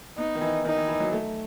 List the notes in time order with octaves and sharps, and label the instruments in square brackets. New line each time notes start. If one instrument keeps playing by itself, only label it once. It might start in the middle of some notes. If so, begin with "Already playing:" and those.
[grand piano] B3 [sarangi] D#4
[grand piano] D#3
E3
[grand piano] D#3 [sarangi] D#4
[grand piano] E3
E3
F#3
A3